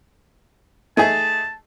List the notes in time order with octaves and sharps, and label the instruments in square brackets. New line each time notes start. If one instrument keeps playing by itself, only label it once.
[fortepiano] A3 D#4 G#4 [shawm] A5